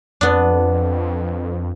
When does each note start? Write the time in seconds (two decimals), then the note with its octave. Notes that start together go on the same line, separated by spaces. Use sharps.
0.21 F2 B3 D4